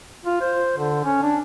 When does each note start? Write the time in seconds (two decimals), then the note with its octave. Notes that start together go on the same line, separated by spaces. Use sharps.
0.25 F4
0.41 C5
0.77 D3
1.04 C#4
1.23 D4